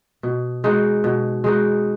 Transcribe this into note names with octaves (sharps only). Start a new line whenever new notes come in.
B2
G#3 D#4 F#4
B2
G#3 D#4 F#4